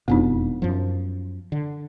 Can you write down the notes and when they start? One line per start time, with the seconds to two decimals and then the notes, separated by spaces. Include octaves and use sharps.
0.08 E1 F2 B2 B3 D4 D#4
0.62 F#2 F3
1.52 D3